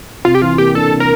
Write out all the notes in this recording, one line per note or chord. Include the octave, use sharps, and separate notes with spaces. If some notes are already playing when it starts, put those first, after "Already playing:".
C3 F4
G4
E3 F4
A#3 G4
D4 A4
C3
A#4